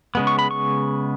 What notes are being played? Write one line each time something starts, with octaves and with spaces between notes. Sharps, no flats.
C#3 G#3 B3
C#6
B5
C#6